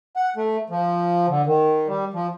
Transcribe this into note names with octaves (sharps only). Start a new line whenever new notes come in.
F#5
A3
F3
D3
D#3
G3
F3